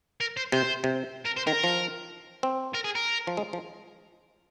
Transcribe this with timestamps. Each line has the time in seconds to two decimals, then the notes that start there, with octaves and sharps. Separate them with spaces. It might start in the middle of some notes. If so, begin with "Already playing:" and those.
0.21 A#4
0.37 C5
0.52 C3 C5
0.84 C3
1.26 A#4
1.37 C5
1.47 D#3 A#4
1.64 F3
2.43 C4
2.75 A#4
2.85 G#4
2.95 A#4
3.27 F3
3.37 G#3
3.53 F3